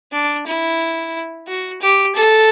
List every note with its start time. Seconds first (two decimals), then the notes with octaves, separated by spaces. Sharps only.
0.12 D4
0.47 E4
1.48 F#4
1.81 G4
2.16 A4